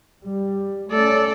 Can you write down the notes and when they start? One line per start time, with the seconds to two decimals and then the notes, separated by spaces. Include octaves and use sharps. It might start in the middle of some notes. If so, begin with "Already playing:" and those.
0.23 G3
0.91 A3 C#4 A4 D5